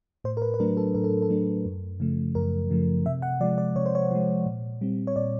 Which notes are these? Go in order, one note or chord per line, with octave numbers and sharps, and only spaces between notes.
A2 C5
A#4
B4
B4
F#3 A3 D4 A#4
A4
A2 A#4
A4
A4
F#3 A3 D4
F#2
C#3 F3 A3
F#2 A#4
C#3 F3 A3
C3 E5
F#5
F3 G#3 D5
D5
C3 C#5
C5
C#5
F3 G#3
A#2
G3 C4
C#5
A#2 D5